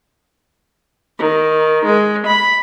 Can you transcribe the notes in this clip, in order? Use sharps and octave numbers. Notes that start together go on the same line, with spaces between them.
D#3
G#3
B5